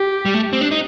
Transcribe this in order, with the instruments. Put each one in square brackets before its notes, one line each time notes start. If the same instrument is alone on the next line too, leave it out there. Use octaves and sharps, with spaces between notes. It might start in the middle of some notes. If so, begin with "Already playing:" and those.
Already playing: [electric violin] G4
[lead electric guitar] G3
A3
C4
D4
D#4